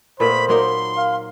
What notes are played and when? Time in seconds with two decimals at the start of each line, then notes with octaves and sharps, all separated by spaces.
0.20 A#2 A3 B3 C5 B5
0.49 F#3 A#3 D#4 C6
0.97 F5